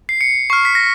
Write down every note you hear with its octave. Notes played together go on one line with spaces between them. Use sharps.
C7
C#7
C#6 F6 C7
B6
A#6